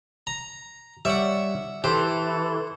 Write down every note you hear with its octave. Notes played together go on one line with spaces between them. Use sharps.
A#5
G3 C#5 D5 E5 F#5
E3 G4 A4 C5